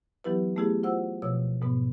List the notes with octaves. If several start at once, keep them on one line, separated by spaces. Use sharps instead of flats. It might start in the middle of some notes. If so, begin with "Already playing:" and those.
E3 F#3 B3 E4 G4 B4
A3 B3 E4 G4 G#4
F4 C5 F#5 E6
B2 F3 C#5 E6
G#2 B2 B3